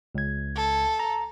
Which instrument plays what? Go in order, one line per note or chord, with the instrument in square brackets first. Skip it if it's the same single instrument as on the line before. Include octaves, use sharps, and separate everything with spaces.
[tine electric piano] C#2 G#6
[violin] A4
[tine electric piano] A#5